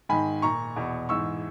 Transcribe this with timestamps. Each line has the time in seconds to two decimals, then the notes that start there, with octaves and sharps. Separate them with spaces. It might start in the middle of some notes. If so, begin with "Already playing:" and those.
0.09 G#2 D#3 G#5 B5
0.42 A#2 A#5 C#6
0.76 E2 B2
1.09 G#2 E3 C#6 E6